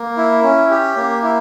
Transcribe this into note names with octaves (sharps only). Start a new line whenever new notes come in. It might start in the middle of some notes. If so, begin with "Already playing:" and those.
Already playing: A#3
E4
C#4
G4
A#3
E4